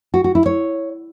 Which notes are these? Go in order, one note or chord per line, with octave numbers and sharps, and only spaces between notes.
F#4
F#4
E4
C#5